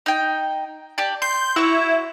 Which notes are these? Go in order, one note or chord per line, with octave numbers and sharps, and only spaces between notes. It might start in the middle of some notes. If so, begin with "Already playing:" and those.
D#4 G5
G4 D5 A5
C6 G6
E4 F#4 C#5